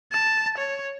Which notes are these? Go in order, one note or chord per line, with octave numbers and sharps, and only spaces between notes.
A5
C#5